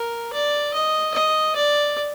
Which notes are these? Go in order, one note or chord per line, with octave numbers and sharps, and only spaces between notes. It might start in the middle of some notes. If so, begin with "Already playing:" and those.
Already playing: A#4
D5
D#5
D#5
D5